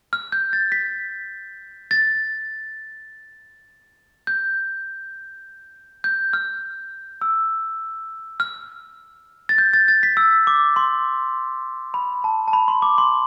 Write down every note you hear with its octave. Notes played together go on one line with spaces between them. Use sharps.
F6
G6
A6
B6
A6
G6
G6
F6
E6
F6
A6
G6
A6
A6
B6
E6
D6
C6
B5
A5
A5
B5
C6
D6
C6